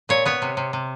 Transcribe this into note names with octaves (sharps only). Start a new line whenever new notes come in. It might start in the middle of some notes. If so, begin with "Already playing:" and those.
A#2 C#5
B3 C#5
C3
C3
C3